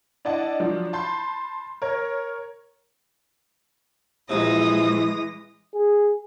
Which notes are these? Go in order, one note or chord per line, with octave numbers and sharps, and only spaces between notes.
D4 E4 D5 D#5 F#5 A5
F3 F#3 D4
A5 B5 C6 G6
A#4 C#5
A#1 C3 E3 G#3 D#6 A#6
G#4